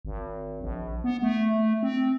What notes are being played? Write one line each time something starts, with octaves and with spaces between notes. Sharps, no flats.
G#1
A#1
B3
A3
C4